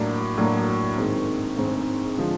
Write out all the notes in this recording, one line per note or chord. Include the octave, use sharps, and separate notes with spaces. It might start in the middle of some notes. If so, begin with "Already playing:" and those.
Already playing: A2 F#3 A#3 D4
A2 F#3 A#3 D4
G#2 D#3 G#3 C4
G#2 D#3 G#3 C4
D3 F3 G#3